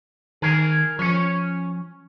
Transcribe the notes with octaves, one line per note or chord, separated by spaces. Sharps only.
D#3 G#4 A#4
F3 C#4 C#5